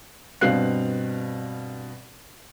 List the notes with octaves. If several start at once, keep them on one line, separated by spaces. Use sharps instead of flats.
G2 B2 C4 F5 F#6 C7